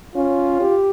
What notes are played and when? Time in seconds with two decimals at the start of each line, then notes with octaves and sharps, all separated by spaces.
0.16 C#4 F4
0.61 G4